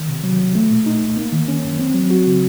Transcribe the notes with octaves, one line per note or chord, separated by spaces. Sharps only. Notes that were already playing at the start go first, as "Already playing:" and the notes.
Already playing: D#3
C3
F#3
C2
A3
A#2
D#4
C2
A#3
D#3
C#4
F#2
C4
F#3
F#4
C#3